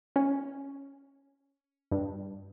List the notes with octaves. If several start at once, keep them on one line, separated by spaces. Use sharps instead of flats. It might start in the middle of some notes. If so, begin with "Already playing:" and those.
C#4
G2